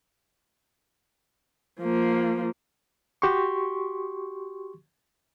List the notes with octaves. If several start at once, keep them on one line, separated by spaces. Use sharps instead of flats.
F3 A#3
F#4 G4 C6 C#6